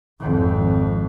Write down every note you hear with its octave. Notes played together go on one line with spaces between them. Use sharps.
G#1 F2